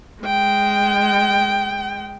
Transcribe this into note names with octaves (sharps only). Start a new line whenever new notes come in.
G#3 G5